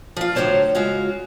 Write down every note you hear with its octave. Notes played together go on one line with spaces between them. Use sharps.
F3 F4
A2 D3 F#3 C5 C#5 A5
C#3 G#3 F4 F#4